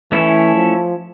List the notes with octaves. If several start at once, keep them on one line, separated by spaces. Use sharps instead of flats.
E3 A3 C#4 E4 A4 C#5
F3